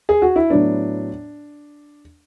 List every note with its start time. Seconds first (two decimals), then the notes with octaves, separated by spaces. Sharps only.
0.09 G#4
0.22 F#4
0.36 E4
0.50 A2 F#3 B3 D4